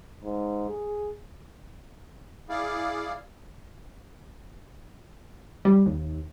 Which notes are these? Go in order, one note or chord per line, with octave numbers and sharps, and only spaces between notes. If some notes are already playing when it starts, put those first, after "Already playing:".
G#2
G#4
E4 G#4 D5 F5
G3
D#2